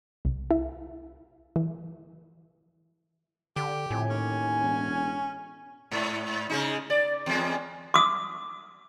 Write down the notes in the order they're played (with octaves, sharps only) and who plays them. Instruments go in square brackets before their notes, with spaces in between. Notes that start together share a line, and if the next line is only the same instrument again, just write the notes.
[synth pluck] C2
E4
E3
[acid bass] D3 [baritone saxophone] G4
[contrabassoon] F2 [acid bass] A2 [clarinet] G#5
[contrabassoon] D#2 [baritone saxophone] C#4
[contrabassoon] E1
[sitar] G#2
C#3 G#3 D#4
D5
E2 G#3
[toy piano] D6 D#6